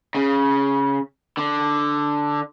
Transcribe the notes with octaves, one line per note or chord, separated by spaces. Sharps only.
C#3
D3